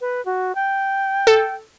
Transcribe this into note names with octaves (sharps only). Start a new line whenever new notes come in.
B4
F#4
G5
A4